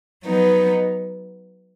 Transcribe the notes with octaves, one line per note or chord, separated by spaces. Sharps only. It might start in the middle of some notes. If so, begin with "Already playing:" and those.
F#3 B3 D#4